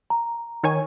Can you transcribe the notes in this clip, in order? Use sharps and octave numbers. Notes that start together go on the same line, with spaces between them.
A#5
D#3 C#5 G#5